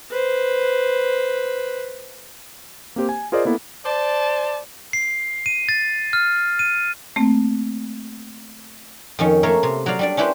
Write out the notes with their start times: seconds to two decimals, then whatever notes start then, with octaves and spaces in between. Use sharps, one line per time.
0.11 B4 C5
2.96 A#3 C4 G4 C5
3.09 G#5
3.32 F4 G#4 A#4 C5 D5 D#5
3.45 A#3 B3 E4 A4
3.85 C5 D5 A5
4.93 C7
5.46 D#7
5.69 A6
6.13 F6
6.59 D#7
7.16 A3 A#3 C4
9.19 F2 D#3 C#4
9.43 A3 A#3 A#4 C#5 E5
9.63 C3
9.86 F#3 F#4 D5 F5
9.99 G3 D4 D5
10.17 C#4 D4 E4 G4 B4 C5